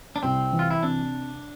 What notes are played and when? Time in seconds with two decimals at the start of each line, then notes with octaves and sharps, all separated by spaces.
0.16 D4
0.23 C2 C4
0.53 E3
0.59 F4
0.71 E4
0.83 C3 D4